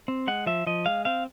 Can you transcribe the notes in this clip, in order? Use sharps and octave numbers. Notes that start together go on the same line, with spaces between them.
C4
G#3 F#5
F3 E5
F3 D#5
G#3 F5
C4 F5